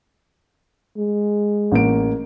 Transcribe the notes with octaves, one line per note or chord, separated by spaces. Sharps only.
G#3
A1 A#3 D7